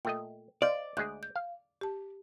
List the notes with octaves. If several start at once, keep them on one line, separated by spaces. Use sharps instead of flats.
A#2 A3 D#5 G5
C5 D5 D#5 F5
D2 G#3 G#4 F#6 G6
G6
F5
G4 A5